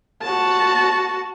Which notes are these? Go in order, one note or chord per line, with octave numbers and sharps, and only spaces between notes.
F#4 A5